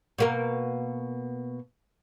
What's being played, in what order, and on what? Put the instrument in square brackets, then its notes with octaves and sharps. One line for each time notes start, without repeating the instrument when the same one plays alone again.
[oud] B2 A#3 A#4